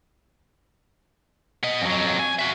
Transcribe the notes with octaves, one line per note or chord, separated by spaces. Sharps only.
B3 D#5
F2 F#3
G#5
F#4 E5